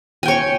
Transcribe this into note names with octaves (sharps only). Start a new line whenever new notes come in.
C#5 G5 G#5 C#6